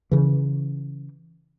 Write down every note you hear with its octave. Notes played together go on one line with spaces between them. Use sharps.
C#3 E3